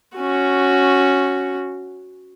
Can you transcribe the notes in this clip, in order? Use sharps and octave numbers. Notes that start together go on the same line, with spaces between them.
C#4 F#4